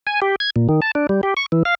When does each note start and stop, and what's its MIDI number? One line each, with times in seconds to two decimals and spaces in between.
0.07 0.20 80
0.22 0.36 67
0.40 0.50 92
0.56 0.68 46
0.69 0.80 51
0.82 0.91 81
0.95 1.07 62
1.09 1.21 55
1.23 1.34 67
1.37 1.46 85
1.52 1.63 52
1.65 1.75 77